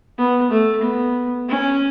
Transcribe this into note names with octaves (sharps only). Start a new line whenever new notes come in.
B3
A3
B3
C#4